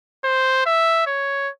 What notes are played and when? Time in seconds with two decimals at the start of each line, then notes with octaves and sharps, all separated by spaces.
0.25 C5
0.66 E5
1.07 C#5